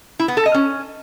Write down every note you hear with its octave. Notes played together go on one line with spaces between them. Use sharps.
E4
B3
A4
D#5
C#4